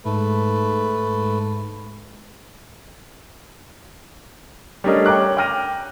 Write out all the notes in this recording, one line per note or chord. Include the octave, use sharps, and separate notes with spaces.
G#2 A3 B4
G3 A3 C#4 D4 A#4 D#5
C#5 G5 A#5 D6 F#6
G5 D6 F6 A#6 D#7